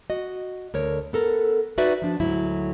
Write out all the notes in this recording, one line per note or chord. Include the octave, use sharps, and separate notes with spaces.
F#4 D#5
D2 A#4 C#5
B3 A4 A#4
D#4 F#4 B4 D5 E5
F3 D4
D2 G#2 F#3 E4